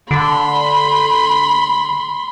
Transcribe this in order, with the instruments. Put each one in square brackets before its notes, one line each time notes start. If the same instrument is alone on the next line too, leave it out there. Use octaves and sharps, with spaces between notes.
[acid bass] D3 [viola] B5 C6